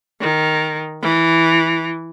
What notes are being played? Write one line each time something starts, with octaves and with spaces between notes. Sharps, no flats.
D#3
E3